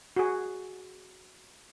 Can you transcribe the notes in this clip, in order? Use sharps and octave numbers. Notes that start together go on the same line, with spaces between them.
F#4 G#4